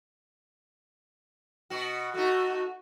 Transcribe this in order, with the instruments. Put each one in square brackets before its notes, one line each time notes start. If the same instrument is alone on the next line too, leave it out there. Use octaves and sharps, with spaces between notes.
[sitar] B2 F#4
[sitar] A3 D#4 [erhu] F#4